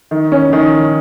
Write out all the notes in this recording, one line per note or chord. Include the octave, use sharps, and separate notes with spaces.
D#3
C#4
D#3